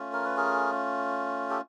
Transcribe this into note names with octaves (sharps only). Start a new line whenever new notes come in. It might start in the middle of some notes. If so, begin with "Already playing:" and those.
Already playing: A3 C#4 F4
A#4
B4
G#4 A#4
G4 A4